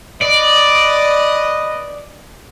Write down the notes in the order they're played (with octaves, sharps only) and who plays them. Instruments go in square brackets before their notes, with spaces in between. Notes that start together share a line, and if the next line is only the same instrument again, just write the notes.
[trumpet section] B4 D#5 [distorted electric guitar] D5